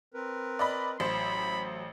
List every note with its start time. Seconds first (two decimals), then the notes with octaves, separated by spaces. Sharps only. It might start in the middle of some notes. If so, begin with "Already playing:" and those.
0.14 C4 A#4 B4
0.59 D5 D#5 B5
1.00 A1 F#3 C5 B5